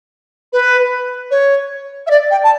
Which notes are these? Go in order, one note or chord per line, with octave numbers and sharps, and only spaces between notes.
B4
C#5
E5
D5
G5
A5